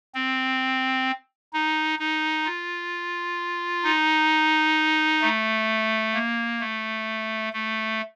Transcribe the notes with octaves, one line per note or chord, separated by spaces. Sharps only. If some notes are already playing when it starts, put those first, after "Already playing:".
C4
D#4
D#4
F4
D#4
A3
A#3
A3
A3